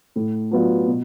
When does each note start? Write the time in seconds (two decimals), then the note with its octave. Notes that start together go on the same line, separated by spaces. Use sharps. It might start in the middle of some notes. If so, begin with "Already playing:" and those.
0.16 A2
0.51 F#3 B3 D4 F4
0.87 B2